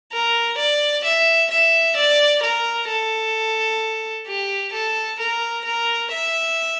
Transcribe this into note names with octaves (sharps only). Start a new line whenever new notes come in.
A#4
D5
E5
E5
D5
A#4
A4
G4
A4
A#4
A#4
E5